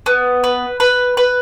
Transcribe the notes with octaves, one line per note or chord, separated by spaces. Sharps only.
B3
B4
B4
B4